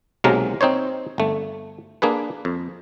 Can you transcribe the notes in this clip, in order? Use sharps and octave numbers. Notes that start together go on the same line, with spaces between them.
B1 C3 F#3 G#3 A#3 A#4
C4 D#4 C5 C#5
G1 A3
A#3 D4 G#4 B4
F2